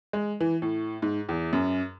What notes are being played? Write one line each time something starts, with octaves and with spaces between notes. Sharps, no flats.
G#3
E3
A2
G#2
E2
F#2